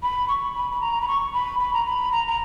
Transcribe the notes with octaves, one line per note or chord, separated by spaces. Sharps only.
B5
C#6
B5
B5
A#5
B5
C#6
B5
B5
A#5
B5
A#5
A#5